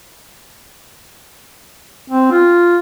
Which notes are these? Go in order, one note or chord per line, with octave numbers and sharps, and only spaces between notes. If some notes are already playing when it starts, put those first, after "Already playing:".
C4
F4